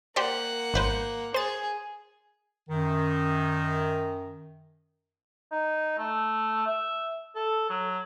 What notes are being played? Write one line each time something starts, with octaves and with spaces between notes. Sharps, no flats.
A#3 G4 C5 D5 F#5
G#1 B4 C5
G#4 C5 A6
F#2 D#3
D#4
A3
E5
A4
F#3